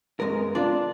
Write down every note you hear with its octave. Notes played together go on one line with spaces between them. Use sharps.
F#2 G#3 B3 A#4
D4 F4 D5